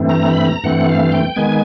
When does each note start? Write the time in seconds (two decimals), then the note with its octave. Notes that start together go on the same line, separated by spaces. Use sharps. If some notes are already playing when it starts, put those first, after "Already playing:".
Already playing: G2 E3 A3 C4
0.09 A#5
0.28 B5
0.45 A#5
0.64 G2 E3 A3 C4 F#5
0.88 F5
1.12 G5
1.36 D#3 G#3 B3 G#5